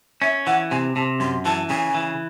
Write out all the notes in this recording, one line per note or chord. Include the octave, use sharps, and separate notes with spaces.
C#4 E5
E3 F#5
C3 G#5
C3 A5
F#2 C6
E3 A5
C#3 G#5
E3